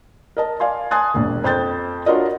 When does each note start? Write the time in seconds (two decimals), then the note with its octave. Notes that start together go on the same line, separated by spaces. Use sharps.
0.37 A#4 D#5 A5
0.60 D5 F5 G#5 C6
0.91 G#5 A5 C6 D#6 F#6 A6
1.14 E1 A#1
1.44 F2 C5 G5 D#6 G6 A6
2.06 D4 F4 F#4 A#4 C#5 D#5